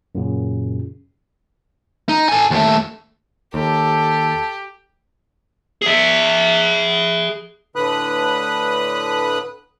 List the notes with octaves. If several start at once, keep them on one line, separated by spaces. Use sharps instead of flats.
F#2 A#2 C#3
D#4
A4 G#5
D#2 A3
D#2 G4 A4
G#4 E5
A2 D3 B4 B5 D#6 F#6